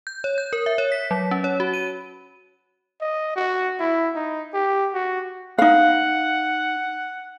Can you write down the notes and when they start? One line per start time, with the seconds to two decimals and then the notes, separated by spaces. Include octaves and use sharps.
0.07 G6
0.24 C#5
0.38 G6
0.53 A#4
0.66 E5
0.78 C#5
0.92 B6
1.11 F#3
1.31 C#4
1.44 C#5
1.60 F#4
1.74 D#7
3.01 D#5
3.36 F#4
3.80 E4
4.15 D#4
4.54 G4
4.94 F#4
5.58 D#4 F5 F#5